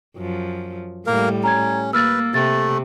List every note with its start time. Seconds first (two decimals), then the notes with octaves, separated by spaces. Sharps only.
0.17 F#2 F3
1.06 A2 G3 A#3 A#4
1.44 C#4 A#5 G#6
1.93 A#3 B4 E6 F6 A6
2.34 C3 A3 A6